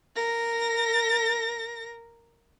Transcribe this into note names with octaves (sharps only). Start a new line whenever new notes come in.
A#4 A#6